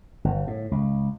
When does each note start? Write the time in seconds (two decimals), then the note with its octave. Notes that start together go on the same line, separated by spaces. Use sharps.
0.24 G1
0.47 A2
0.71 C#2